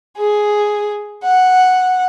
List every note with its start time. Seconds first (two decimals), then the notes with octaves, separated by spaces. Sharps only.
0.17 G#4
1.24 F#5